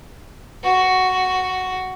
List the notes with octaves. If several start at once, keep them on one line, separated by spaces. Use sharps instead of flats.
F#4